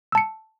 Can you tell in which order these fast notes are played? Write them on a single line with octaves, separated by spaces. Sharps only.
E6 A5 C#7